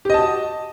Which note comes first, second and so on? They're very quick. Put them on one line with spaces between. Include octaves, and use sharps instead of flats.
G4 D#5 A5 F#4